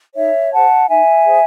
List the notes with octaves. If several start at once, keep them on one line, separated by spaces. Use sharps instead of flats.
D#4 C#5 E5
G#4 C5 F#5 A5
D#4 E5 G#5
G#4 C5